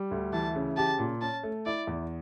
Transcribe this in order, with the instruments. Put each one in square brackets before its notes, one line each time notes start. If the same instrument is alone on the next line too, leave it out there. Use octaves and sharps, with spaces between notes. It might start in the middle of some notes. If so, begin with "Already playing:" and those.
Already playing: [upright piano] G3
D2
[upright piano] E3 [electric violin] A5
[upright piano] C#3
[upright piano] G4 [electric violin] A5
[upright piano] A#2
[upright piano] C#4 [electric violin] A5
[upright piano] A3
[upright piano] E4 [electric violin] D5
[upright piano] E2